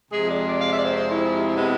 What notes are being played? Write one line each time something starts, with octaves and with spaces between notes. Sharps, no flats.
F2 C3 G#3 G#4
D5
D5
F5
E5
D5
C5
C5
E4
C3 G#3 B3